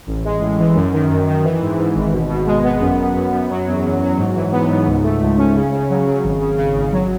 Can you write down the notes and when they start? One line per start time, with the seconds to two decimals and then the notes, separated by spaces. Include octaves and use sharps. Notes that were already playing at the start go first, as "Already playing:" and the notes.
0.07 A1
0.25 G#3
0.41 A2
0.59 E3
0.75 F#2
0.93 D#3
1.09 F#2
1.27 D#3
1.44 E3
1.61 G#2
1.79 G#2
1.95 G#1
2.12 B2
2.29 B2
2.46 G#3
2.63 B3
2.81 F#2
2.99 F#2
3.15 F#2
3.33 F#2
3.50 F#3
3.67 E2
3.84 E2
4.01 F#3
4.18 G#2
4.35 E3
4.52 B3
4.69 G#2
4.86 C#2
5.03 A3
5.21 C#2
5.37 C#4
5.55 C#3
5.73 C#3
5.89 F#3
6.07 C#3
6.24 G#1
6.41 C#3
6.58 C#3
6.75 G#1
6.92 F#3